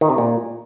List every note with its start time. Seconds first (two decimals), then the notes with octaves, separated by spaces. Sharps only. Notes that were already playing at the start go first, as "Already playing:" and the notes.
0.01 D#3
0.10 C3
0.18 A#2